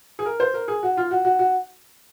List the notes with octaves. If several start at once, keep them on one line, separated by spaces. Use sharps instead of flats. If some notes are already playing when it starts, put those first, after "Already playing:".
G#4
A#4
C5
A#4
G#4
F#4
F4
F#4
F#4
F#4